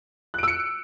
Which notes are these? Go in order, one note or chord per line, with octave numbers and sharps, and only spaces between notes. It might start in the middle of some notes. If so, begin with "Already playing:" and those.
E6 F#6 C#7 D7